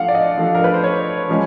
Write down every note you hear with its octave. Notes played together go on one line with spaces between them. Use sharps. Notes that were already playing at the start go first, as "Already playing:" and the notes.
Already playing: F3 A3 D4 F5 F#5
D5
D#5
F3 A3 D4
A#4
B4
C5
C#5
F3 G#3 C#4